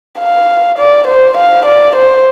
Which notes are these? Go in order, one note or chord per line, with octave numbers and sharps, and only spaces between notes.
F5
D5
C5
F5
D5
C5